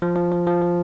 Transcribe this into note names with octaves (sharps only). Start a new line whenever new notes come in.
F3
F3
F3
F3
F3